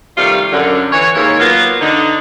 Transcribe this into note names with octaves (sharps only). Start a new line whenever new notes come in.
C3 D#3 G3 A3 F4 F5
F#2 D3
E3 C#5
D#2 G#2 A#3 E4 C#5
F#3 A#3 B3 F4
D3 D#4